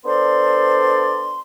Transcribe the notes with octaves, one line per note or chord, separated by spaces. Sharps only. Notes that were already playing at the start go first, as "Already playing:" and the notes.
B3 D4 A4 C5 D5 C6